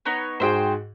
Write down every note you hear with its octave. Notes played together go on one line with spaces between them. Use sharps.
B3 D#4 C#5
G#2 F#4 G#4 C5 E5 G5